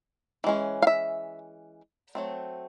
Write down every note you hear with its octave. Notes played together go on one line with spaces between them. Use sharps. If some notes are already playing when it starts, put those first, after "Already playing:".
E3 G#3 C#4
F5
E5
F#3 A3 C4